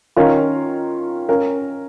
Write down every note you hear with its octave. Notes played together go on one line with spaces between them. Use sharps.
D#3 C#4 F4 A#4 F5
C#4 A#4 F5